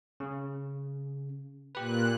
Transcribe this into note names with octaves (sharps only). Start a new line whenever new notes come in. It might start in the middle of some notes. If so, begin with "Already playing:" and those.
C#3
A#2 G4 B4 F#6